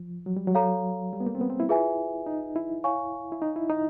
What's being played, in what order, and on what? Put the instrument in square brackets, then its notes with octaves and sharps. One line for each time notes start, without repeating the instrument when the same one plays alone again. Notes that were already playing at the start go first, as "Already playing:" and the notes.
Already playing: [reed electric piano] F3
F#3
G3
F#3
[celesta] A4 C#5 F5 A#5
[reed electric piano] G3
B3
A#3
C4
B3
C4
E4
[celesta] F4 G#4 B4 E5 G#5
[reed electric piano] D#4
E4
[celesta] C#5 F5 G#5 C#6
[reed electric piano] E4
D#4
E4
D#4